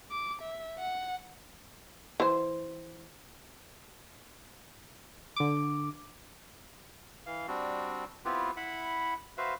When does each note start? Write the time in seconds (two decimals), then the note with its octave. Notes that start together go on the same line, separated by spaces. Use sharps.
0.11 D6
0.42 E5
0.79 F#5
2.20 E3 C5
5.36 D3 D6
7.26 E3 F5
7.48 G3 C4 D4 F#4
8.25 B3 C4 E4 F4 G4 B4
8.57 E4 E5 F#5 B5
9.38 F#4 B4 C5 E5 F5